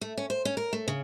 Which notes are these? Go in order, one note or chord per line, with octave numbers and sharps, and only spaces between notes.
A3
C#4
C5
C#4
A#4
A3
C#3